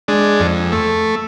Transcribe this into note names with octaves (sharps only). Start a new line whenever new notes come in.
G#3 D4
F2
A3